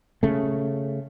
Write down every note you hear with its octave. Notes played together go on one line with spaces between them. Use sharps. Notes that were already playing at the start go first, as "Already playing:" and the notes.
C#3 A3